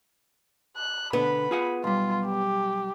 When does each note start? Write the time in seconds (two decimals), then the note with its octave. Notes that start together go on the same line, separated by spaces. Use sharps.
0.76 F#6
1.13 B2 D3 B3 B5
1.51 F4 G#4 F#5
1.84 B1 G3 F4
2.25 G4